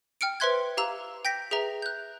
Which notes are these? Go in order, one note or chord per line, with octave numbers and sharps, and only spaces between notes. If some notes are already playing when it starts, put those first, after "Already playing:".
G5 F6 C#7 D7
B4 C5 E5 C6 F#6 G#6
G4 F5 A#5 E6
G5 G6 A#6 B6
G#4 B4 E5 A#5
F#6 G6